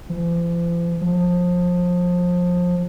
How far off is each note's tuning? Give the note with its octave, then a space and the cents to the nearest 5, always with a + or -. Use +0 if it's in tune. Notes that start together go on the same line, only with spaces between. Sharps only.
F3 -40
F3 +25